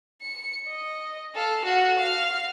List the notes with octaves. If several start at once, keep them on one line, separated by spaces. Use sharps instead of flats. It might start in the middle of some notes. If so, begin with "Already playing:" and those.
C#7
D#5
A4 F5
F#4
F5 F6